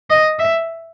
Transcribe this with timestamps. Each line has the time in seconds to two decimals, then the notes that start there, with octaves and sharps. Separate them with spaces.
0.10 D#5
0.39 E5